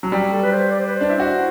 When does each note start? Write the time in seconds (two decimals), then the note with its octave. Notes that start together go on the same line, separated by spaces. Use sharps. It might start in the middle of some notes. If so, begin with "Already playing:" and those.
0.03 F#3
0.12 G3
0.32 A4
0.42 B4
0.52 C5
0.71 D5
0.80 C5
0.87 B4
0.96 C5
1.01 D4
1.10 E4
1.20 F#4